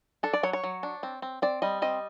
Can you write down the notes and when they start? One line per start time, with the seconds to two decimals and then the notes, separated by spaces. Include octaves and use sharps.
0.23 D4 A4
0.33 D5
0.43 F#3 C#5
0.53 C#5
0.63 F#3
0.83 D4
1.03 C4
1.22 C4
1.42 C4 D5
1.62 G3 D#5
1.82 C4 D#5